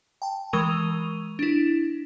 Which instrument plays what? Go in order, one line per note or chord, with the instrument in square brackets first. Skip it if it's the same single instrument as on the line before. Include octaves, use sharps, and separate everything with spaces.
[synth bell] G5 A5
E3 G#3 A#4 C#6 D#7 F7
D4 E4